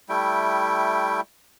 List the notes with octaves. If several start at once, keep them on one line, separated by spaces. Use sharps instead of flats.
G3 A3 E4 G5